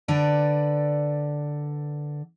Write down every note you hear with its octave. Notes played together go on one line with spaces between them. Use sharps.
D3 B4 D5